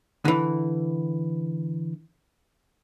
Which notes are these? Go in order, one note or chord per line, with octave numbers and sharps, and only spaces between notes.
D3 E3